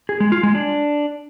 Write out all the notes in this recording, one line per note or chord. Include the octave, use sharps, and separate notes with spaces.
G#4
G#3
F4
G#3
D4